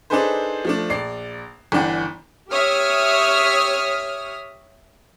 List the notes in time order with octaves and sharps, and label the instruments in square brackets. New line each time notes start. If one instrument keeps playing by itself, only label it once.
[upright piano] D4 D#4 G#4 A4 B4 C5
F3 A3 D4
A#1 D5 C7
G1 E3 D4 F#5 G5
[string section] G4 C#5 E5 D#6 F6